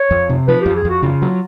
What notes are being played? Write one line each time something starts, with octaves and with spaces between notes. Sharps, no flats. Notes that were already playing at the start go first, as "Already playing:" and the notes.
Already playing: C#5
F2
C3
F3 B4
F2 G4
G#4
F2 F#4
C#3 F4
F#3